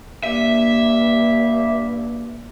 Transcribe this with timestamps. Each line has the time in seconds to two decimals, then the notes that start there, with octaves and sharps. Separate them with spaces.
0.23 G2 A#3 E5